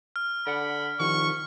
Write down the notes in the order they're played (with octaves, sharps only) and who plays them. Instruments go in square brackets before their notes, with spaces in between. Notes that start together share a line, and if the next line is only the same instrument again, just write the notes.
[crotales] F6
[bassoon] D3 [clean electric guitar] D5 F#5 [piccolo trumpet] B5
[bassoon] C2 [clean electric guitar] D#3 F3 [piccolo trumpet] C#6